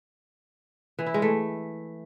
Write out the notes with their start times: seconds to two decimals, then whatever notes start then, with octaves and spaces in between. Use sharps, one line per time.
0.99 E3
1.06 E4
1.14 G#3
1.22 A3